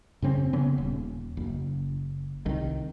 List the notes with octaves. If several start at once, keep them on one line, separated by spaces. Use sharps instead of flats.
F#2 C#3 C4 C#4
C#3 B3 C#4
D#1
F#1
C2 D#3